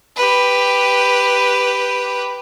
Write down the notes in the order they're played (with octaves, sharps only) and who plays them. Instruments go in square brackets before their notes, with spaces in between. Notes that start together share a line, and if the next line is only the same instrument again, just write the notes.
[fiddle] G4 B4